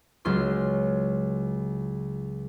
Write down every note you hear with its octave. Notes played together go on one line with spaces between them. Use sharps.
C#2 F#3 C#4 F4 C6